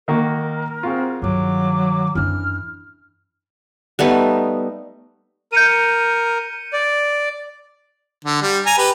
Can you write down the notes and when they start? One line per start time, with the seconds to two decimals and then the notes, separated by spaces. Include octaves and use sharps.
0.08 D#3 A#3 F#4 A#4
0.83 C4 F4 F#4 G#4
1.22 G2 D#3 F#3 D6
2.15 F#2 E3 D4 F6
3.99 G3 A3 B3 D#4
5.52 A#4 G6 C#7 D#7
6.73 D5
8.25 D3
8.42 G3
8.66 G#5 A#5
8.78 G4 B4